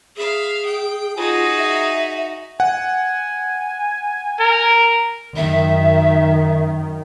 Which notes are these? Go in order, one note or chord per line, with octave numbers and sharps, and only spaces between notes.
G#4 E5 F5
G5
D#4 F4 F#4 G#4
E5
F#5 G#5
A#4
F#2 D#3 E5